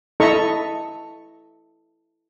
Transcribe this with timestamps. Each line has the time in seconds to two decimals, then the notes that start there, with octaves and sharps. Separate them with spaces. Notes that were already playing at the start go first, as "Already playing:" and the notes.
0.20 E4 A4 D#5 E5 A#5 C#6